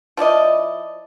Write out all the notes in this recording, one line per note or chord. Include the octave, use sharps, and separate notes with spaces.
F3 E4 D5 D#5